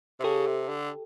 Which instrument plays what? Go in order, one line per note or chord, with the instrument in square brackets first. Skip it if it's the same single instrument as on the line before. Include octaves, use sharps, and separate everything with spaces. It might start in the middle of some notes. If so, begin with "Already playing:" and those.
[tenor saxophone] C3
[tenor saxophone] C#3 [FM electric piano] G4 A4
[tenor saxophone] C3
D3